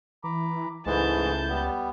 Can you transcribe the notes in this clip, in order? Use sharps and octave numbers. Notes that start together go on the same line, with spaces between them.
E3 A#5 B5 D6
C#2 G#2 E3 G#3 A3 E4 A5 G6
G3 B3